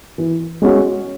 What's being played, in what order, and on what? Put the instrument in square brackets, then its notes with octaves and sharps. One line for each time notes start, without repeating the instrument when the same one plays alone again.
[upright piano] E3
G#3 C#4 F#4